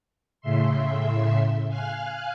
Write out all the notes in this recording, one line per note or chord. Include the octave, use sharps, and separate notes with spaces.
A2 C#3 E5 C6
F5 G#5 F6 F#6